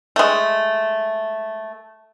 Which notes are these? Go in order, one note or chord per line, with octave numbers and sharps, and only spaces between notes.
G#3 A3